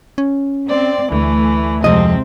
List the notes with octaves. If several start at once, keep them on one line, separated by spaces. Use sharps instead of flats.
C#4
C4 D5
D2 E3 A3
F2 C3 G#3 C4 D#5